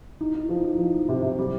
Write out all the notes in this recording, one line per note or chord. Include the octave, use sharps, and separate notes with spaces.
D#4
D#4
F3
D#4
F3
D#4
C3
C3
G3